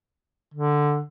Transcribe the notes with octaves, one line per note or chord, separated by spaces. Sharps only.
D3